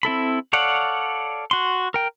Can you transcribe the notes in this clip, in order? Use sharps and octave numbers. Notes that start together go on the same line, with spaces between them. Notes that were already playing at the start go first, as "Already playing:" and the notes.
C4 E4 A4 B5
A4 C#5 D5 F5 F#5
F#4 C6
A#4 G5